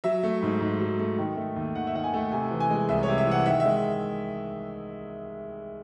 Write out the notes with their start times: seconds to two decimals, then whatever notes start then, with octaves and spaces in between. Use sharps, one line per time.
0.04 F#3 E5
0.23 A3
0.43 G#2
0.61 G#2
0.80 F#3
0.99 A3
1.18 D#3
1.36 A3
1.56 D#2
1.75 D#2 F#5
1.87 E5
1.94 D#3 F#5
2.04 G#5
2.13 A3
2.31 C3 G#5
2.51 E3
2.60 G#5
2.70 G#3
2.89 C2 E5
3.03 C#5
3.08 C3
3.18 E5
3.27 E3 F#5
3.46 D#3 E5
3.60 E5
3.65 G#3